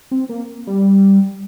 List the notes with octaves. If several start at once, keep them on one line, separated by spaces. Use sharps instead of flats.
C4
A#3
G3